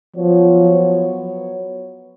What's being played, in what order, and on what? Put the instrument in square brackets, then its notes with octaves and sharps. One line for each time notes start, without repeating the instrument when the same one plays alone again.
[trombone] F3 [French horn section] F#3 B3 F#4 C#5